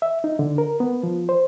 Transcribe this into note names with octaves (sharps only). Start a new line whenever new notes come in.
E5
D#4
D3
A#4
B3
F3
C5